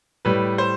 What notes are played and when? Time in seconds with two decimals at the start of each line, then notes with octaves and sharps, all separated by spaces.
0.25 A2 G3 B4
0.58 C5